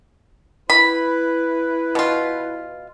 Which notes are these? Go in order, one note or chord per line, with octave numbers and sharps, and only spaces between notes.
E4 B4 B5
B2 F4